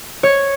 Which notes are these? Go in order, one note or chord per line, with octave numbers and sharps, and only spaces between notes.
C#5